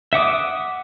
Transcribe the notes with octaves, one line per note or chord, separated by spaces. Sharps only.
E5 F#5 D6 D#6